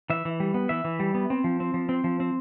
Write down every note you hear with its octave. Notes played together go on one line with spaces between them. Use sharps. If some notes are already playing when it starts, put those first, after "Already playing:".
E3 E5
E3
G3
B3
E3 E5
E3
G3
B3
C4
F3
C4
F3
C4
F3
C4